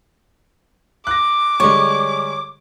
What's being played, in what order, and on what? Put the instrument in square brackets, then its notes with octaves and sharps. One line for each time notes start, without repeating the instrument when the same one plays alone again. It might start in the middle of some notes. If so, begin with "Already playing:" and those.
[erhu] D6 [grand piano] F#6 A#6
[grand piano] D3 G3 G#3 [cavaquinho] C#5